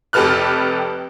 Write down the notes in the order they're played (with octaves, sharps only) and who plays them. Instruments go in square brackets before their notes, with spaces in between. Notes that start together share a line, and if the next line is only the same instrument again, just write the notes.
[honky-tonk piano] F1 G4 A4 B4 F6 F#6